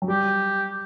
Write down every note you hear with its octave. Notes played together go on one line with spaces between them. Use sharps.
F#3
G3 G4